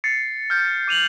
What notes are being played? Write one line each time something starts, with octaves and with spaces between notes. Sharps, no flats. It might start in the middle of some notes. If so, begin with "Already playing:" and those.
A6 C7 C#7
F6 G6
D6 D#7 F7 F#7